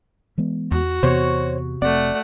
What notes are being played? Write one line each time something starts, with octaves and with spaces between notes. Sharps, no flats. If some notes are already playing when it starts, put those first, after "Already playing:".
E3 G#3 B3
E2 F#4
E2 C3 B3 C5 C#5 C#6
F1 A3 C4 D5 F#5